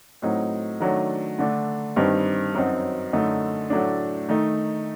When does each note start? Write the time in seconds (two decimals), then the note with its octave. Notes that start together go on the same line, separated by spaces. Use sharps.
0.22 A2 F#3 C4 D#4
0.80 D#3 F#3 A3 D4
1.39 D3 A3 D4
1.96 G2 D#3 G3 C4 D#4
2.54 F#2 F#3 C4 D#4
3.13 F#2 D3 A3 D#4
3.70 A2 F#3 A3 D4
4.28 D#3 A3 D#4